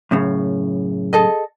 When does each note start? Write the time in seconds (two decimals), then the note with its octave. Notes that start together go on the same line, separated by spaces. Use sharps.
0.11 F#2 A2 C#3
1.13 G#4 A4 D#5